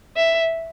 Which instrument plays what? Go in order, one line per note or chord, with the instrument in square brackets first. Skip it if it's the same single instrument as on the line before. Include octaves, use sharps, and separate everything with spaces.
[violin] E5